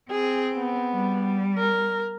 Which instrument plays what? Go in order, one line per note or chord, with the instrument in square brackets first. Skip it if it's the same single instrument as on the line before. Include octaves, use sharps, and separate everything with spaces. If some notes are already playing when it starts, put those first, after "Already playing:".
[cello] C4 [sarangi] G#4
[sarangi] B3
[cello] G3
[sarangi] A#4